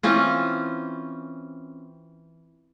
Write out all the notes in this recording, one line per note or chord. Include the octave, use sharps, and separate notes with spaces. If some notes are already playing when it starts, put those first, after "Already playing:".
E3 C4 C#4 F4